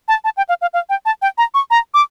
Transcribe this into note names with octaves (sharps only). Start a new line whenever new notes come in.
A5
A5
G5
F5
F5
F5
G5
A5
G5
A#5
C#6
A#5
D6